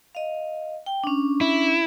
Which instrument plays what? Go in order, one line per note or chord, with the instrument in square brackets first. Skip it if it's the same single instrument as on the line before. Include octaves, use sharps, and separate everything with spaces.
[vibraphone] D#5 F5
G5
C#4 D4
[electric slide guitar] E4